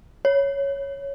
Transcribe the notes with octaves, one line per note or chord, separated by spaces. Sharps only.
C#5